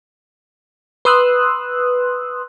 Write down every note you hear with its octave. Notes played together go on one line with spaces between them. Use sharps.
B4 C6 D#6 E6 F#6